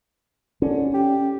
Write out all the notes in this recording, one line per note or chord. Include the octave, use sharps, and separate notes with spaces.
D3 C#4
G4